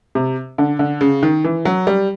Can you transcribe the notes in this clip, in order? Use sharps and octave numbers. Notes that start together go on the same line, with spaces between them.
C3
D3
D3
C#3
D#3
E3
F#3
G3